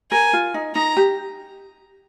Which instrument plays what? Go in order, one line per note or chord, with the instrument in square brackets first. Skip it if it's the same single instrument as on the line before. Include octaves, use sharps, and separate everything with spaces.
[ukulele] A#4 [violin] G#5
[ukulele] F4
D#4
[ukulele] D#4 [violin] A#5
[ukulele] G4